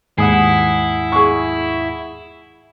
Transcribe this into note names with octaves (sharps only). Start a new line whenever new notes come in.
D#2 G#2 E4 F#5 G#5 D#6 C7
G#4 C#6